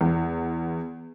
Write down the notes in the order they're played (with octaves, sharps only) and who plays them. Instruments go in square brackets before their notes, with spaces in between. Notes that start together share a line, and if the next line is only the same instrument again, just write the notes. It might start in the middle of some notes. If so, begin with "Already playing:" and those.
[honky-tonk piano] E2